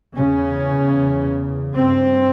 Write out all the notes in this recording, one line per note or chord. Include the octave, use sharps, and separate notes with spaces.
E2 C#3 C#4
G2 C4